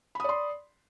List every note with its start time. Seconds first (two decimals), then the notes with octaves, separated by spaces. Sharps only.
0.15 B5
0.20 D#6
0.24 D5
0.29 C6